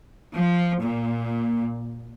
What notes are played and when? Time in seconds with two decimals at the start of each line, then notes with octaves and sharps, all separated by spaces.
0.34 F3
0.81 A#2